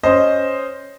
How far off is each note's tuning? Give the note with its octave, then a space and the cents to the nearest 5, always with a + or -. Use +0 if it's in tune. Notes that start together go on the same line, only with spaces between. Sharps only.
C#4 +0 C5 +0 D#5 +0